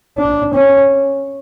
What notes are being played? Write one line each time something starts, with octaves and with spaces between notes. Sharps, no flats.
D4
C#4